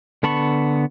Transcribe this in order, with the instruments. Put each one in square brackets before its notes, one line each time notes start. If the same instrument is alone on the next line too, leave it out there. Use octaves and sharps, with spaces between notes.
[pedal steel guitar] D3 B3 A5 B5 C#6